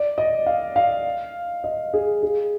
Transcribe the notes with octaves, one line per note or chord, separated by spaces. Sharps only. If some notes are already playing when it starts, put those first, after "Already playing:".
Already playing: D5
D#5
F5
F5
D#5
G#4
G#4